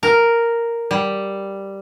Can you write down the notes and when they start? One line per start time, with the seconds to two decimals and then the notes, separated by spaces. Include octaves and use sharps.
0.03 A#4
0.91 G3